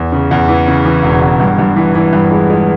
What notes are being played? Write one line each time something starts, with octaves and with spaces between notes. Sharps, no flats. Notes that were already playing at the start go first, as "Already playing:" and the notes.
Already playing: E2
C#3
E2
E3
C#3
E3
E1
E2
G2
G2
E3
E3
G2
G#3
G#3